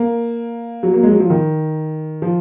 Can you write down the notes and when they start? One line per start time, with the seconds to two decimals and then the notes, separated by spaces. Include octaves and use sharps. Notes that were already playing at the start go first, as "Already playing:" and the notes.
Already playing: A#3
0.83 F#3
0.94 A#3
1.03 G#3
1.11 F#3
1.20 F3
1.30 D#3
2.22 F3